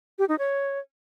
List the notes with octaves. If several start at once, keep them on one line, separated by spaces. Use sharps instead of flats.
G4
D#4
C#5